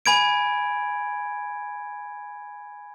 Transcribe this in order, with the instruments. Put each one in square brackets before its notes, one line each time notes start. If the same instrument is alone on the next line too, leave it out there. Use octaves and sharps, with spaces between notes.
[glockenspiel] G#5 B5 G#6 D7